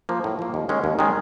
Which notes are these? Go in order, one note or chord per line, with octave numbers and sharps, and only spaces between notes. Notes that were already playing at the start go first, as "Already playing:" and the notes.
F3 A#3
A2
F3 A#3
D#2
D#3 G#3 C#4
D#2
D#3 G#3 C#4